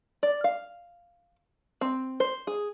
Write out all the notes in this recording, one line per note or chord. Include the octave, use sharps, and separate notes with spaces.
D5
F5
C4
C5
G#4